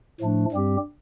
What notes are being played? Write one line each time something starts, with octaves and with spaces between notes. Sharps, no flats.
A2 F3 A3 D4
G2 G3 C4 G4